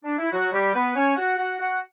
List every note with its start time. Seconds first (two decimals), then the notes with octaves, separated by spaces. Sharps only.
0.04 D4
0.18 E4
0.31 F#3 F#4
0.52 G3 G4
0.73 B3 B4
0.95 C#4 C#5
1.16 F#4 F#5
1.37 F#4 F#5
1.59 F#4 F#5